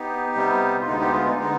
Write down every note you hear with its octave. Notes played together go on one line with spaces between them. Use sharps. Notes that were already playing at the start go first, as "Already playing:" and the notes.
Already playing: B3 D#4 G4
C3 G3 B3
F4
D2 D3 G#3 B3 D#4
D#4 G4
F4
D#4
D3 G#3 B3 D#4